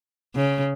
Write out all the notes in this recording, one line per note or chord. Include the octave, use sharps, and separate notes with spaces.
C#3